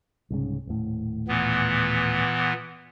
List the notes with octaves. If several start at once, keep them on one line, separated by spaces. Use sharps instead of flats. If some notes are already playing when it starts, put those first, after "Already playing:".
C2 G#2 C#3
D#1 A2
A#2 E3 B3